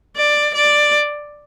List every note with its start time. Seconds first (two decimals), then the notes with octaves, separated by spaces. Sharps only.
0.17 D5
0.55 D5